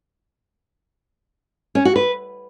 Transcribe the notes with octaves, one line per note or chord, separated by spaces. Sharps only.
C#4
F#4
B4